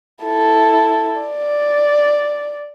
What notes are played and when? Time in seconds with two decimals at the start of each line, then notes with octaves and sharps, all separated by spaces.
0.24 E4 A4
1.21 D5